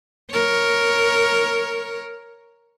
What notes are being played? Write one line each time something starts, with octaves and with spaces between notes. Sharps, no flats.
A#4 C#5